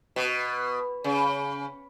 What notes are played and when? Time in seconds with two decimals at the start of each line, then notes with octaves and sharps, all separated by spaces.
0.16 B2
1.04 C#3